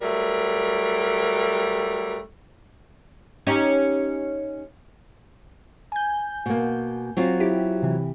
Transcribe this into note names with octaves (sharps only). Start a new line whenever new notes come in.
F#3 G3 A3 A#4
C#4 D#4 G4
G#5 G6
B2 A#3
F#3 C4 F4
E4 G4
C3 E3